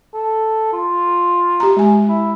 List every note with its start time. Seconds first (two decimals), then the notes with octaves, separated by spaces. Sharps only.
0.14 A4
0.73 F4
1.60 G4 A#5
1.77 G#3 G#5
2.08 E4